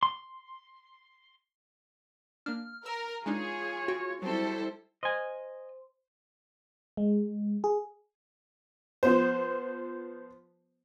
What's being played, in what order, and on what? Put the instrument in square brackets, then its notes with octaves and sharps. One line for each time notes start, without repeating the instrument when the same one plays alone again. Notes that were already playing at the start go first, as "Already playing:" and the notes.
[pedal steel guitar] C6
[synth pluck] A#3 D4 [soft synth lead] F6
[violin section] A#4 [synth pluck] E6
[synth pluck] G#3 D4 D#4 [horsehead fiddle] F4 C#5 [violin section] G#4
[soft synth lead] F#4 [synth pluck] G5
[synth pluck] F#3 C4 [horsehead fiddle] G3 E4 [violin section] A4 C5
[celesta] C5 C6 [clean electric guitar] D#5 G#5
[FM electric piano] G#3
G#4
[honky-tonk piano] F3 B3 C5